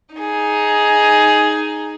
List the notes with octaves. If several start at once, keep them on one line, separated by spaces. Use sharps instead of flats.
D#4 G#4